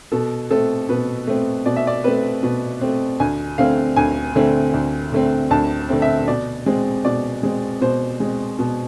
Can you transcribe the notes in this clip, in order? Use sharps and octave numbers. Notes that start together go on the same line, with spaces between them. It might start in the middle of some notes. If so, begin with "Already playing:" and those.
B2 A4
A3 C4 A4
B2 B4
A3 C4
B2 D5
E5
D5
A3 C4 B4
B2
A3 C4
D2 G#5
D3 A3 C4 F5
D2 G#5
D3 A3 C4
D2
D3 A3 C4
D2 A5
D3 A3 C4
E5
B2 D5
G#3 C4
B2 D5
G#3 C4
B2 C5
G#3 C4
B2